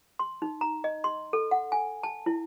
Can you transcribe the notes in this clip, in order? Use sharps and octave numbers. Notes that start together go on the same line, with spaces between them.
C6
D#4
A#5
D#5
C6
A4
F#5
G#5
A5
E4